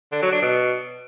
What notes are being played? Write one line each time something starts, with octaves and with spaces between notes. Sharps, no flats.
D3
F#3
D4
B2